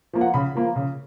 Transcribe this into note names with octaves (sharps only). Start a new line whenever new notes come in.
F3 A#3
F#5
C#3 B5
F3 A#3
C#3